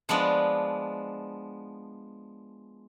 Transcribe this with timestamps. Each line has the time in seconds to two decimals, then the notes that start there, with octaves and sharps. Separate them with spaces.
0.09 F3 G#3 B3 D4